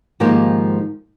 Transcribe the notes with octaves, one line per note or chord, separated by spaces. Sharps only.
G#2 D#3 F3 G#3 A#3 G4